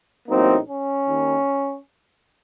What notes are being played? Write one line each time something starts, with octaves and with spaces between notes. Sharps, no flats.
A1 A2 F#3 A#3 C4 D#4
C#4
D#2 D#3 A#3